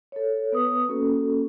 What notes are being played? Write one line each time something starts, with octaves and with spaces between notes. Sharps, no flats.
A4 C#5
B3 B4 D#6
A#3 C#4 F#4 A4